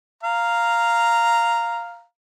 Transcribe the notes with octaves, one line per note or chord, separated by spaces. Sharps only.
F5 A#5